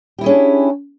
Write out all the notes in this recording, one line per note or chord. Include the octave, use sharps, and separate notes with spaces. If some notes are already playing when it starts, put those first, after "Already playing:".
C#4 D4 E4 G4 G#4